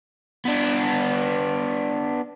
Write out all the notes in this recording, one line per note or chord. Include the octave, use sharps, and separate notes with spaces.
B3 D4